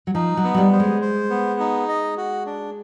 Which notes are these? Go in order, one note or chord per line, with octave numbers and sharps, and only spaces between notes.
F#3
F3 D#4
F#3
B3
F#3
G3
C5
G#3
C5
B3
D#4
D#5
F#4
D4